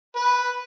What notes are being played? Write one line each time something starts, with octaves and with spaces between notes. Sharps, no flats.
B4